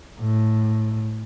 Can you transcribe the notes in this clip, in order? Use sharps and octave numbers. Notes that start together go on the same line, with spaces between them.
A2